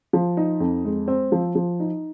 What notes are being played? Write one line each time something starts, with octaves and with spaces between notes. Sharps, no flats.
F3
D#4
F2
G#3
C4
F3
F3
D#4